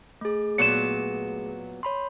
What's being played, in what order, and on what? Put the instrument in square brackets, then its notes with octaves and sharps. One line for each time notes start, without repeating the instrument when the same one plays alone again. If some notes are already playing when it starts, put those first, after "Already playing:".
[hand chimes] A3 G#4
[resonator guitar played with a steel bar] A#2 F#3 B3 [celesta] C#7 E7
[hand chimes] C#5 B5 C6